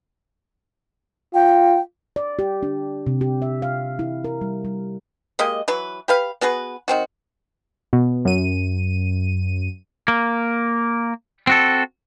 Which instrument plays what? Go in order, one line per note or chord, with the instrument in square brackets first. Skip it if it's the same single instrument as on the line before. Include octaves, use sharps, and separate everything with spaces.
[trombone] F4 [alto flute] G5
[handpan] D5
G4
D4
C3
G4
E5
F5
E4
A#4
G3
G3
[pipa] G#3 A#3 G4 D#5
E3 F#3 B4
G4 B4 F5
B3 F#4 G#4 B4
D#3 C4 F#4
[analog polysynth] B2
F#2 D#7
[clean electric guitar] A#3
C4 F#4 A4